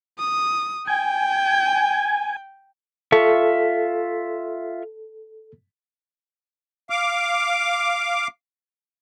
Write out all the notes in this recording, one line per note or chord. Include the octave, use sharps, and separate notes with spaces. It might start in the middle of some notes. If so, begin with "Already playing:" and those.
D#6
G5 G#5
F4 A4 E5 C#6
F5 D6